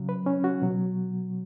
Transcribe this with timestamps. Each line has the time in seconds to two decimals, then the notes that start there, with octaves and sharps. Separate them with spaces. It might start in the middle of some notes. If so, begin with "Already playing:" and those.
Already playing: C#3 F#3
0.09 B4
0.26 C#4
0.44 F#4
0.62 B2 F#3